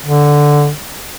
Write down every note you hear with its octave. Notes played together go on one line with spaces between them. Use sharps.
D3